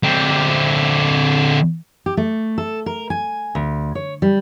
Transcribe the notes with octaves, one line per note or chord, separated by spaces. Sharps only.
D3 C4
G4
A3
A4
A#4
G#5
D2
C#5
G3